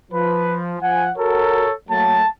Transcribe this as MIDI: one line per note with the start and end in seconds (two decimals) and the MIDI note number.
0.12 0.76 53
0.12 0.57 71
0.80 1.10 53
0.80 1.10 78
0.80 1.04 80
1.17 1.66 66
1.17 1.72 69
1.17 1.66 70
1.17 1.72 73
1.89 2.22 54
1.89 2.22 57
1.89 2.22 58
1.89 2.28 81